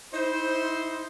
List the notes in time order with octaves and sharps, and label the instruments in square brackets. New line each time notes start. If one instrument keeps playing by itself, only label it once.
[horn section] D#4 E4 C5